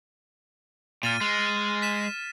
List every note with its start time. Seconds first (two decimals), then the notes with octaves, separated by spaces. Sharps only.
1.03 A#2 F6 A6 D#7
1.21 G#3
1.82 B6 E7